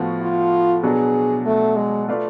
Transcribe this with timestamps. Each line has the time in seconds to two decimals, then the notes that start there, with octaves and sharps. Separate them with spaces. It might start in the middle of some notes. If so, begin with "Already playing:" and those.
Already playing: A2 F3 B3 F#4
0.21 F4
0.83 B2 F#3 B3 D4 F#4 G#4
1.46 A3
1.76 G#3
2.08 A3 F4 B4 D5 F5